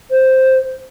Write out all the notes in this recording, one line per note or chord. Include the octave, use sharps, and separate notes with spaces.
C5